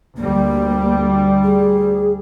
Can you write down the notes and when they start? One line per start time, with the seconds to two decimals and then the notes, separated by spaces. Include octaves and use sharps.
0.17 D2 G3 A#3
1.43 G#4